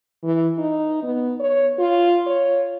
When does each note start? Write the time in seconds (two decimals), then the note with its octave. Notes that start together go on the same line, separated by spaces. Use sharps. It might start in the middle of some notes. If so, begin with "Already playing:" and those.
0.24 E3
0.58 D#4
1.03 B3
1.40 C#5
1.79 F4
2.27 C#5